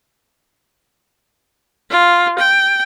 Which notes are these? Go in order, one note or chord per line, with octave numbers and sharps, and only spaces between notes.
F4
G5